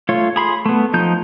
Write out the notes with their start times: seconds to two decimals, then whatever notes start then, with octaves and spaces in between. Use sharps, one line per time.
0.09 A3 F4 C#5
0.36 G#4 B5 C6
0.66 A3 B3
0.93 F3 D#4 G6